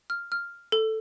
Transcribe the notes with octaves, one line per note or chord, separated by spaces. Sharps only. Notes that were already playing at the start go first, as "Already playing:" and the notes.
F6
F6
A4